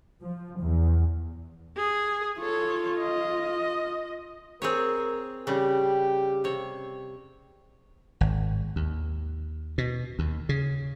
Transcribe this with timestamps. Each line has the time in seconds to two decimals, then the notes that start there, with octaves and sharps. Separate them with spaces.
0.22 F3
0.60 E2
1.77 G#4
2.40 F4 A4 C#5
2.99 D#5
4.62 C4 G#4 A#4 C#5
5.47 C#3 G3 G4
6.44 C3 C#5
8.21 G#1
8.76 D#2
9.78 B2
10.19 D#2
10.49 C#3